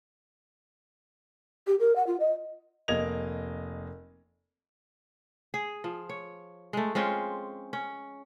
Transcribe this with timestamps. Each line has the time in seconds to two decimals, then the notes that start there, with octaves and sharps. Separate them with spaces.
1.67 G4
1.80 A#4
1.96 F#5
2.07 F4
2.20 D#5
2.88 F1 A#3 D#5 G#6 F7
5.54 G#4
5.84 F3
6.09 C#5
6.73 G#3 A3
6.95 G#3 C4 C#4 F4
7.73 C#4